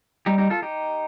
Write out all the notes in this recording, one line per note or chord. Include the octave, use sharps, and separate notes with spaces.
G3 D#4 G4
D#4 G4
F4 A4
D#4 G4